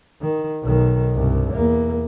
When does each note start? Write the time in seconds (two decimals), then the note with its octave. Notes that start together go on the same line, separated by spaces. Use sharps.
0.21 D#3
0.64 B1 D#3
1.14 C2 G2
1.53 E2 A#3